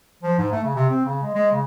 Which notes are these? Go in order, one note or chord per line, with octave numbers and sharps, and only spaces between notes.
F3
G#2
A3
C#3
C3
C4
C#3
G#3
G#3
C#3